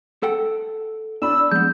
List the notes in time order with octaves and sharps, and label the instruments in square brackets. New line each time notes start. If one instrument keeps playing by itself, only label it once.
[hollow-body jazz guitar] A4 F#5 G5
[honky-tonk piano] D4 B5 [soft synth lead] E6
[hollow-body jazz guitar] F3 B3 [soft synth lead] G#3 [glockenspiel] G6